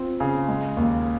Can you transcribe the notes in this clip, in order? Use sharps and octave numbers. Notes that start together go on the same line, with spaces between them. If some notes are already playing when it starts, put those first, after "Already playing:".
Already playing: C4 F4
C#3
G#3
D#2